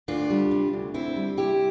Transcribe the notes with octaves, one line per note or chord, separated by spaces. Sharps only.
D2 D4 F4
G3
C3
D2
D2 C4 E4
G3
C3 E4 G4